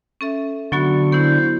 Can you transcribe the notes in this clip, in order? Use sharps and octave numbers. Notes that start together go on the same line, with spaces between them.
C#4 A4 E5
D3 F#3 B3 F#4 C#6
B3 E4 C5